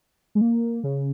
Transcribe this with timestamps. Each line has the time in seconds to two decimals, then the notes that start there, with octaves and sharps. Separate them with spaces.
0.35 G#3
0.41 A#3
0.84 C#3